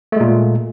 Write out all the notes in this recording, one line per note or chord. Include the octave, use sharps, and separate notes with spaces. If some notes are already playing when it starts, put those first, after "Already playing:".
A#2 G#3 A3